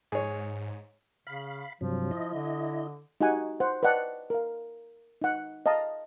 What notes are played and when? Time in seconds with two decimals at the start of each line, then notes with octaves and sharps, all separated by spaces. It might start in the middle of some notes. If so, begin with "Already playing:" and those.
0.12 G#2 G#4 C#5
1.27 C#3 F5 B5
1.81 G2 C3 F3 F#3
2.11 E4 D#5
2.34 D3
3.21 D#4 F#4 G4 F#5 G#5
3.60 C5 F#5
3.83 B4 D5 D#5 F#5 G5 A5
4.30 A#4 F5
5.22 D#4 F#5
5.66 D#5 F5 A5 A#5